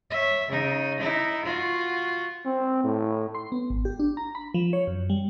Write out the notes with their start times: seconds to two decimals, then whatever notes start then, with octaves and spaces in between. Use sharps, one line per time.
0.10 C#5 E5
0.48 C#3 D#4
1.00 D#4 E4
1.45 F4 F#4
2.45 C4
2.84 A2
3.35 C6
3.52 B3
3.70 G#1
3.85 G4
3.99 D4
4.17 A#5
4.35 B5
4.54 F3
4.73 C#5
4.87 F#2
5.10 G3